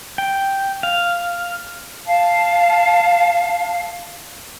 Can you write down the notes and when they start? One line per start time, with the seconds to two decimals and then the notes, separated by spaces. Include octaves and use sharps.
0.18 G5
0.83 F5
2.07 F5 A5